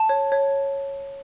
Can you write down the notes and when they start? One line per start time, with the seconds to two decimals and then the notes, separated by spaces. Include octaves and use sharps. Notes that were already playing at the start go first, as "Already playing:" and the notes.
Already playing: A5
0.09 C#5
0.32 C#5